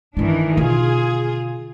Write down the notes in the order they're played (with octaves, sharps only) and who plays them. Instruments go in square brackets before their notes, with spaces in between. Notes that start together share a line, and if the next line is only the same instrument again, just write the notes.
[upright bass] G2 G#3 [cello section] D#3 E3 D4
[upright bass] B2 D3 [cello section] F4 G#4